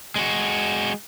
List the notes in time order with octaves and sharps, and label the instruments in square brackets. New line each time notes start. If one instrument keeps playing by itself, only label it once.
[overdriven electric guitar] G#3 F#4